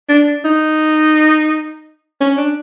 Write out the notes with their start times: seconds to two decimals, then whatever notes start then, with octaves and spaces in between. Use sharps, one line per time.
0.09 D4
0.44 D#4
2.21 C#4
2.37 D4